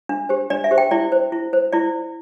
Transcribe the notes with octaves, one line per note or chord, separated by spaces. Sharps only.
D4
G4 C5
D4 D5
E5
G4 C5
G5
E4 D5
C5
E4
C5
E4 D5